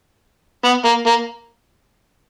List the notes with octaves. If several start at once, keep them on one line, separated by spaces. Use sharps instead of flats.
B3
A#3
A#3